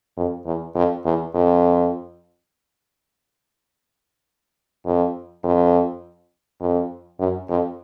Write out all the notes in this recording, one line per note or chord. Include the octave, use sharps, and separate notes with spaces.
F2
E2
F2
E2
F2
F2
F2
F2
F#2
F2